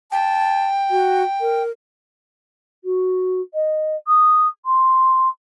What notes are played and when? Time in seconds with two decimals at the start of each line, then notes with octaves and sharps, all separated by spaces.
0.12 G5 A5
0.90 F#4
1.41 A#4
2.84 F#4
3.53 D#5
4.07 D#6
4.65 C6